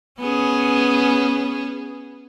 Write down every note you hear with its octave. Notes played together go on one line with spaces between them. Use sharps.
B3 C#4 G#4